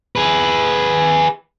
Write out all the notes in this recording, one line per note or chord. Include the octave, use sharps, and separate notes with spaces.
G#4 B4